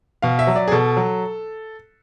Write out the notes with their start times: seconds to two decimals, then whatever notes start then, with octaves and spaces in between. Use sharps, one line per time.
0.22 B2 F5
0.39 E5
0.47 F#3
0.56 D5
0.68 G#4
0.71 B2 A4
0.97 F#3